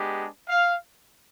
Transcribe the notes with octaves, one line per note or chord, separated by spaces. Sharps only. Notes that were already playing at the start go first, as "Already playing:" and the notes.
Already playing: G#3 B3 D4 G4
F5